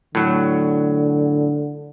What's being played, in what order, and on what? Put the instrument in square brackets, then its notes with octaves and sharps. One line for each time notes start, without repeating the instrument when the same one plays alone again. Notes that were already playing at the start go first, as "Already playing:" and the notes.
[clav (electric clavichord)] A2 F#3 [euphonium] D3